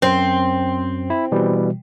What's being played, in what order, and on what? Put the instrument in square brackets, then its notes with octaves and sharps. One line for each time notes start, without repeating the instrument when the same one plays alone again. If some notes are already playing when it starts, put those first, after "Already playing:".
[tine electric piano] F#2 [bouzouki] C4
[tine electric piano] E4
B2 E3 G3